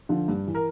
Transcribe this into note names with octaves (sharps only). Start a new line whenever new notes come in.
D3 F3
G2
E3
A#4